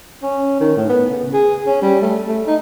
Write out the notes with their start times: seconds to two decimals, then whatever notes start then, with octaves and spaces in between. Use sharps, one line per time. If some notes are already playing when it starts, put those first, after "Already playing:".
0.23 C#4
0.60 D#3
0.77 A2
0.89 B3
1.10 C#3
1.33 G#4
1.67 C#4
1.82 G3
2.02 A3
2.28 A3
2.47 D#4